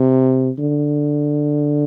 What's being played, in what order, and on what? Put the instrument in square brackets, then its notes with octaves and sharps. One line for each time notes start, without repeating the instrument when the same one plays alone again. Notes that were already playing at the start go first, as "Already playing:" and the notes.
Already playing: [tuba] C3
D3